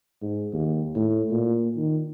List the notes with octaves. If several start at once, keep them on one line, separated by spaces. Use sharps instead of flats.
G#2
D#2
A2
A#2
D#3